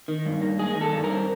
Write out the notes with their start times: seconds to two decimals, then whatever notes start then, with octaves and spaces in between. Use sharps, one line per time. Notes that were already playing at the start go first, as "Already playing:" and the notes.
0.08 D#3
0.26 G2
0.42 A#3
0.59 G#3 G#4
0.76 D#3
0.81 A4
0.92 G2
1.04 A#4
1.09 C4